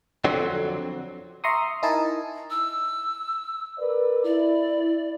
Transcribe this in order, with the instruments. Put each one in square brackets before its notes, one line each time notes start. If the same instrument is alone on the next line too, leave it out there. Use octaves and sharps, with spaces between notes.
[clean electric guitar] F2 D3 F#3 C4
[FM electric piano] E5 A#5 C6 C#6 D#6
D#4 E4 A#4 D#5 G#5 A5
[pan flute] E6
[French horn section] A#4 B4 D5
[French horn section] E4 [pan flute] D5